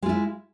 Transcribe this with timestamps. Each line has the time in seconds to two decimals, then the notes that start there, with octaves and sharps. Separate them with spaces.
0.02 G#3
0.06 F4
0.09 E4